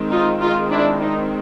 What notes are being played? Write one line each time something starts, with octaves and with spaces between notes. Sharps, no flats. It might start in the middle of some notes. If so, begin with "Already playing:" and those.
Already playing: D#3 G#3 C4
D#4 F4
D#4 F4
D4 E4
D#4